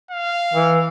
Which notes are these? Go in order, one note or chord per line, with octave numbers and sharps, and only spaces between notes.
F5
E3